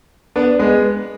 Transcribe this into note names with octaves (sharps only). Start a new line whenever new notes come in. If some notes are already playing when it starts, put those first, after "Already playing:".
B3 D4
G#3 B3